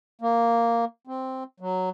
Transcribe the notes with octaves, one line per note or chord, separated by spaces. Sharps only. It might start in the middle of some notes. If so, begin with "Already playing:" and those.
A#3
C4
F#3